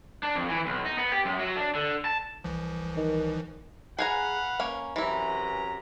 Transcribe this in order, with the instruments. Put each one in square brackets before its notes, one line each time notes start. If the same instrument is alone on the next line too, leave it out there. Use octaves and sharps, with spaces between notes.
[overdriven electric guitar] D4
F2
E3
B1
D#4
B3
G4
F#2
F#3
D4
D3
A5
[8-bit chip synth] C2 E3 F3
[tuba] D#3
[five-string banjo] G#4 G#5 A#5 [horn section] B4 F5 F#5
[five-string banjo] A#3 C#4
[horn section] F#2 C3 A#5 [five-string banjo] E3 E4